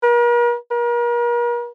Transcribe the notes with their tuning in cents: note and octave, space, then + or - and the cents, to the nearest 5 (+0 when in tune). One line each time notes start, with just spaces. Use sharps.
A#4 +40
A#4 +40